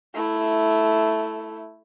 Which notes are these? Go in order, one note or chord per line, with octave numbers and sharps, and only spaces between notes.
A3 E4